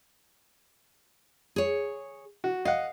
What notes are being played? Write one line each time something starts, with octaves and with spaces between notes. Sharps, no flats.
G#4 C#5
F#4
D#5 F5 F#5